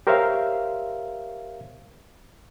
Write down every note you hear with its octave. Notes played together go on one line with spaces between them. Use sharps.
G4 A#4 C5 C#5 E5 F5